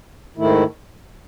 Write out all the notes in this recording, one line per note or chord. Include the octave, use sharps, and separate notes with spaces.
G#2 D#3 A3 E4